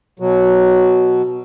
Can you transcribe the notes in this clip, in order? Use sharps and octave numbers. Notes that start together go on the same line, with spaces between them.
B2 F#3